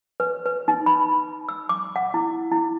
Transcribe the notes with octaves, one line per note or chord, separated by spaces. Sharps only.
B4
B4
D#4
B5
E6
D6
F#5
E4
E4